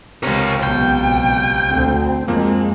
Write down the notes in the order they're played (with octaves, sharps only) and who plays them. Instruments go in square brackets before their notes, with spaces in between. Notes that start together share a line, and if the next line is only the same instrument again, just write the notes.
[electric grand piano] C#2 C3 [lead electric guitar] A#4 C#5
[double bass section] B1 B2 [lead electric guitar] G5
[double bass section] D2 C4
[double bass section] F#2 G#3 [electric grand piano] F3 A#3 C4